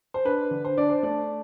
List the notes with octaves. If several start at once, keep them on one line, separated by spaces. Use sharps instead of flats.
C5
D4 B4
D3
C5
D4 D5
C5
A3 D5